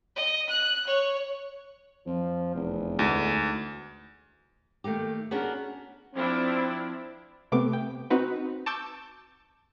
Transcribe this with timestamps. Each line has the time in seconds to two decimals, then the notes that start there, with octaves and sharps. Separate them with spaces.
0.16 D#5
0.49 F#6
0.87 C#5
2.06 F2 F3
2.55 F1 E2
2.99 D2 G#2
4.84 D#3 A3 A#3 G4
5.31 B3 C#4 D4 F#4 G#4 A#4
6.14 F3 C4 D4 E4
7.52 C3 A3 B3 D6
7.73 G5
8.10 C4 D#4 F#4 B4
8.66 A5 C#6 D6 E6 G6 A6